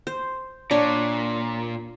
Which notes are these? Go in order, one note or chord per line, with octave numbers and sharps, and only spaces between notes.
C5
A#2 D4 C#5